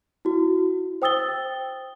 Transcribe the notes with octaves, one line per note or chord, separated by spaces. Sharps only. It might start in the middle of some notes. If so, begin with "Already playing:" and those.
E4 F#4
C5 G5 D#6 E6 A6 G7